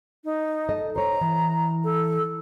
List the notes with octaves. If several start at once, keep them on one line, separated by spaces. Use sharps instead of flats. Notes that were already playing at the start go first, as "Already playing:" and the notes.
D#4
A4 D#5
C5 C#5 A#5
E3
A4